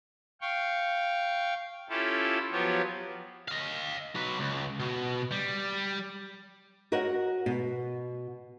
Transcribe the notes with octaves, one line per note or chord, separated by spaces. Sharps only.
F5 G5 C#6
C#4 E4 F4 G4 A4
F3 F#3 B3 F4 G4 C#5
D#5 F5
F#3 B4
C#2
B2
G3
F#4 A#4 C#5 D#5 F#5
B2